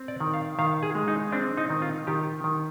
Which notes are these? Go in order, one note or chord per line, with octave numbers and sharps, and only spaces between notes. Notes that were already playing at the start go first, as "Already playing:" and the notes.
Already playing: C4
D5
D#3
F5
D#3 F5
G#4
G#3
D#4
C4 D4
D#4
D#3
F4
D#3 G4
D#3